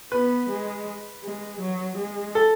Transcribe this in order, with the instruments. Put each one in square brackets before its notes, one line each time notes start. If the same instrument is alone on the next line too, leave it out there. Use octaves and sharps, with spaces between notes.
[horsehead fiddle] B3 [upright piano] B4
[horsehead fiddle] G#3
G#3
F#3
G#3
[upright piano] A4